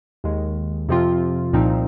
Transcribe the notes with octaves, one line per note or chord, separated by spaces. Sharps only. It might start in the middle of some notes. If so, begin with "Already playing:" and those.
D#2 D#3 G#3
F2 C3 F3 C4 F4
C2 A#2 F3 C4 D#4